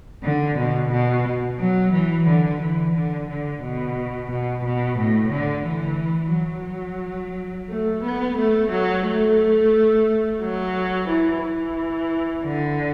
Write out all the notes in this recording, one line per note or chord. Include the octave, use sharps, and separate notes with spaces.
D3
B2
B2
F#3
E3
D3
E3
D3
D3
B2
B2
B2
A2
D3
E3
F#3
A3
B3
A3
F#3
A3
F#3
E3
E3
D3